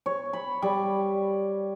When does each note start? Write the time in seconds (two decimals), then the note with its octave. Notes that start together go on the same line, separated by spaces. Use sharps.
0.06 C#5
0.33 B5
0.62 G3